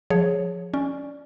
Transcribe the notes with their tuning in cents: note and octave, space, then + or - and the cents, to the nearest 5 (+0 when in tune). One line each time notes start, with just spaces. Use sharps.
F3 +15 G#4 +0 C#5 +0
C#4 +0 D5 +0